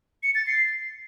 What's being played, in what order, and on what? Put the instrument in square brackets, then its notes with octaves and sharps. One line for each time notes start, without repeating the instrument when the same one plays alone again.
[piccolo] C#7
A6
C7